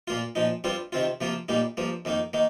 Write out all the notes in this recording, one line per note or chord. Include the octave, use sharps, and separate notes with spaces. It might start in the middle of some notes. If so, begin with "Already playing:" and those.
A#2 A#3 F4
A#2 F3 D#4
G2 G3 C4 F4
C3 D#3 C4 F4
C3 F3 A#3 F4
A#2 G3 A#3 D#4
G2 F3 A#3
F2 D#3 A#3 D#4
D#3 A#3 D#4